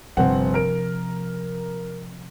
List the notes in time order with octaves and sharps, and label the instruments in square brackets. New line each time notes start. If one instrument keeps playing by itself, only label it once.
[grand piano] G1 C4 F#5 [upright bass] C3 F3
[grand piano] A#4 D7